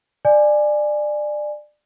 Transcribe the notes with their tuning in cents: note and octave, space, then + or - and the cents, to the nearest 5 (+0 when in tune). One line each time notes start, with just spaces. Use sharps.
D5 +20 G#5 +0